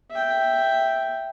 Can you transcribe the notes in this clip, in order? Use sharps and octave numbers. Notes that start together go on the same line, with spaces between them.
E5 G5